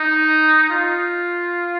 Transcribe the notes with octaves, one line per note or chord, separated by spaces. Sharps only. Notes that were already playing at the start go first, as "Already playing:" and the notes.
Already playing: D#4
F4